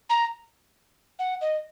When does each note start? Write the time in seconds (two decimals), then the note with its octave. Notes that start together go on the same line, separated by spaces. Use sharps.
0.10 A#5
1.19 F#5
1.41 D#5